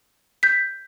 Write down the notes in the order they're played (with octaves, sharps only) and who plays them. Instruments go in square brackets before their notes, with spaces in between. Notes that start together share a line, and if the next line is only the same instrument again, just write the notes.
[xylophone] G6 B6